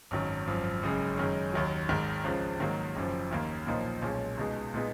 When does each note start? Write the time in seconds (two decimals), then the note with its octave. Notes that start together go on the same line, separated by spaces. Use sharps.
0.11 G#1 F#2 D#3 F#3
0.47 G#1 F#2 F3
0.83 F#1 F#2 C#3 G#3
1.18 F#2 D#3 G#3 C#4
1.53 D#2 D#3 F#3
1.89 G#1 G#2 D#3
2.24 C#2 C#3 F3
2.60 G#2 D#3 F#3 A#3
2.96 F#1 F#2 F3
3.31 D#2 D#3 A#3
3.66 B1 A#2 F3 A#3 D#4
4.02 B1 A#2 G#3 C#4
4.38 C#2 B2 G#3 D#4
4.74 A#2 G#3 B3 D#4